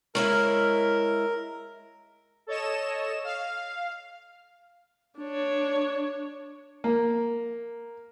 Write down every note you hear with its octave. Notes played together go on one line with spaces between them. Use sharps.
G#3 E4 A#4 C#5 E5 C#6 F6
A4 C#5 D#5 E7
F5
D4 C#5
A#3